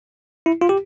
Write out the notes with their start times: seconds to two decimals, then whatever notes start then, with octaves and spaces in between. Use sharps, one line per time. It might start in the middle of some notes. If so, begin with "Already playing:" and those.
0.46 E4
0.61 F4
0.69 G4